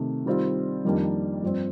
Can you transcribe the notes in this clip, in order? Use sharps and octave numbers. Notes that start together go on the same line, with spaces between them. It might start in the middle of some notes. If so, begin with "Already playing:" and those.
Already playing: C3 D#3 A3
D#3 G3 C4 F4
F2 D#3 G3 A#3 D4
G2 F3 C4